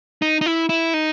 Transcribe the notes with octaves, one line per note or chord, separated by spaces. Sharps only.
D#4
D#4
E4
E4
D#4